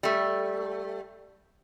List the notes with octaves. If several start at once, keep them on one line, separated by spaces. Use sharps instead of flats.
G3 A3